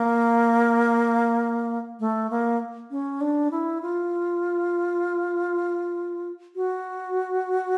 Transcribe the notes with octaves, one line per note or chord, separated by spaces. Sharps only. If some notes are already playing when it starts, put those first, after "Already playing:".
Already playing: A#3
A3
A#3
C#4
D4
E4
F4
F#4